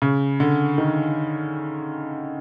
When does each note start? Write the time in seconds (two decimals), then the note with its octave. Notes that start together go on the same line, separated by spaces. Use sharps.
0.02 C#3
0.40 D3
0.78 D#3